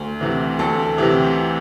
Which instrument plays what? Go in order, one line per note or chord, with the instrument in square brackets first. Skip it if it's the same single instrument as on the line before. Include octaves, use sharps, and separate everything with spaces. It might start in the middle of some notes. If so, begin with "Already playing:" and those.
Already playing: [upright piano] D2
C3 E3
D2 A4
C3 E3 G4